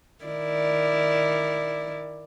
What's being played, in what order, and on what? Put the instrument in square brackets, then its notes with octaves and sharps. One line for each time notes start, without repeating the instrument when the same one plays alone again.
[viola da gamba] D#3 E4 D5